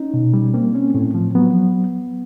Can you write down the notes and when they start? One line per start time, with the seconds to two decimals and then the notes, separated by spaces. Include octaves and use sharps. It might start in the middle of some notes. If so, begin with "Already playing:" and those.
Already playing: C#4 D#4
0.14 B2
0.34 G3
0.54 A#3 C4
0.75 C#4
0.94 A2
1.14 F3
1.35 F#3 B3